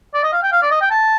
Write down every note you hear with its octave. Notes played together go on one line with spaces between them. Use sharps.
D5
D#5
F5
G5
F5
D5
D#5
G5
A5